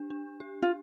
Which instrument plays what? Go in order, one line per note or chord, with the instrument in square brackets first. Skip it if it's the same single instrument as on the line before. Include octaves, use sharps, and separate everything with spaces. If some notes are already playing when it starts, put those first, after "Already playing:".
Already playing: [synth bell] D4 G4
D4
G4
[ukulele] F4